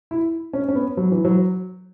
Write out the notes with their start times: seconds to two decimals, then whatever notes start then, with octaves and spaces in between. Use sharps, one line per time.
0.11 E4
0.53 C#4
0.69 C#4
0.75 B3
0.97 F#3
1.12 E3
1.25 F#3